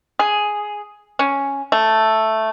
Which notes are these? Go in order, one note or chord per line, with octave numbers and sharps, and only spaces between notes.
G#4
C#4
A3